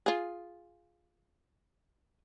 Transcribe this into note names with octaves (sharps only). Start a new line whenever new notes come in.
F4 G#4